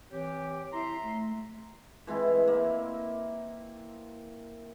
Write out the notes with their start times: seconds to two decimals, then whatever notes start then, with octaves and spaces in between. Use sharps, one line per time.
0.11 E3 C4 G4 C#5
0.73 E4 E5 A#5 C6
1.03 A3
2.07 E3 G#3 C4 E4
2.43 A#3 E5